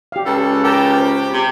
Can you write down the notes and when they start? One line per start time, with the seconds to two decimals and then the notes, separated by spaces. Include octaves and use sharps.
0.12 G4 F5
0.26 C#2 A4
0.64 G4 A#4 A5 A#5
0.98 C5
1.32 C3